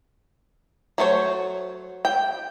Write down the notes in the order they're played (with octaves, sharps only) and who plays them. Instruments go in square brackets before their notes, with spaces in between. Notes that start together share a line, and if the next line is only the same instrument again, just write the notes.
[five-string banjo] F#3 A3 C5 C#5
G5